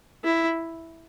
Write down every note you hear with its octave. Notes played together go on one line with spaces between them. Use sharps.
E4